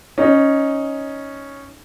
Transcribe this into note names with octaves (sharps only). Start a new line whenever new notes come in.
C#4 D#4